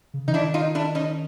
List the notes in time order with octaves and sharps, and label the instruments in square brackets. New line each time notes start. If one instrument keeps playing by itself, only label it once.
[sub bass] C#3
[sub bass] E3 [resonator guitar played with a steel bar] D#4
[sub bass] D#3 [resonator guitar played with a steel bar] D4 E4
[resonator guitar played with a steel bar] D#4 F4
D4 E4
C#4 D#4